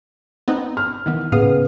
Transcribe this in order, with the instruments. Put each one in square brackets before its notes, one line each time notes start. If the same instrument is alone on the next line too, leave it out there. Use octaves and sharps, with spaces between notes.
[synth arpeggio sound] B3 C4 D#4
[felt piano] F6
[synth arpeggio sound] D#3 E3 B3
[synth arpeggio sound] A2 F5 D#6 [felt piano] C#3 B3 G#4